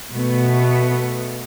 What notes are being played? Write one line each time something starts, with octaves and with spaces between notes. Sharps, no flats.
B2 A3 B3